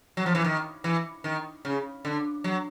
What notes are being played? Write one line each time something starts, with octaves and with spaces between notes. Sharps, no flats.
F#3
F3
E3
D#3
E3
D#3
C#3
D3
F#3